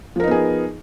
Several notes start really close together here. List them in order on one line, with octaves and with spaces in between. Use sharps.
F3 A#4 D#4 B3 G#4